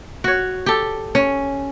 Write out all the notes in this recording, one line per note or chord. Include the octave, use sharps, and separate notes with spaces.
F#4 C#5
G4 A4
C#4